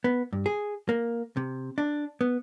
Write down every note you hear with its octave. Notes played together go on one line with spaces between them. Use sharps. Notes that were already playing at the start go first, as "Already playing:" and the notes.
B3
G2
G#4
A#3
C3
D4
B3